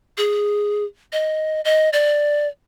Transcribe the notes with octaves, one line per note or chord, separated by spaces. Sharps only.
G#4
D#5
D#5
D5